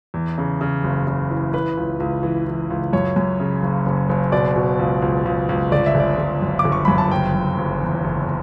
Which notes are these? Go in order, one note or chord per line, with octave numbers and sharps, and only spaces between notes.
E2
C#3
C#3
F#1
C#3
E3
E3 B4
C#2
C#2
E3
E3
C#2
F#2 C#5
F#2
C#3
F#1
F#1
F#1
B2 D5
B2
C#2
C#2
C#2
C#2
G1 D5
E5
G1 D5
G1
F#2
D6
G1
C#6
F#2 B5
A5
F#1 G5
F#1
F#1
E2
F#1